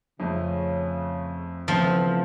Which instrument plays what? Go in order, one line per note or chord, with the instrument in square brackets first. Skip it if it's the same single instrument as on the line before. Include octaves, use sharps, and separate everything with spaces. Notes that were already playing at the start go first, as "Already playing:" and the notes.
[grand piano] F2 A3 [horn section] C#3
[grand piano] C#3 E3 [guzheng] F3 [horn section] A3 B3 C4